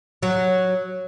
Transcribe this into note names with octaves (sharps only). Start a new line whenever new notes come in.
F#3